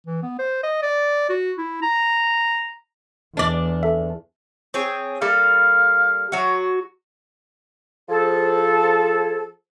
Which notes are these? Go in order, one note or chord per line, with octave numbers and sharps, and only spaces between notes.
E3
B3
C5
D#5
D5
F#4
E4
A#5
E2 D4 D5
A4 E5
C4 G#4 C#5
G3 A#3 A4 F5
F#3 F#4
F3 G#4 A4